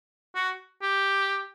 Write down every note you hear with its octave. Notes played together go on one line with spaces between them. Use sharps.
F#4
G4